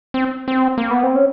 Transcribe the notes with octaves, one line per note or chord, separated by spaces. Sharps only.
C4
C4
A#3
B3
C4
C#4